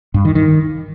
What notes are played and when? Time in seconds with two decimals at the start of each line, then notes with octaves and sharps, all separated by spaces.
0.14 G2
0.25 D#3
0.35 D#3